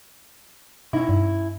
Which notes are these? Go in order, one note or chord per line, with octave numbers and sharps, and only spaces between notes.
B2 C#4 D#4 E4
G2